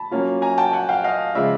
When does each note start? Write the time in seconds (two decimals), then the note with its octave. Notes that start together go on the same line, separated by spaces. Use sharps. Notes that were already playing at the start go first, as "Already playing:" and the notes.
Already playing: A5 B5
0.11 F#3 A#3 C#4 F4
0.42 G#5 A#5
0.58 G5 A5
0.73 F#5 G#5
0.89 F5 G5
1.04 D#5 F5
1.35 C#3 F3 G#3 D5 E5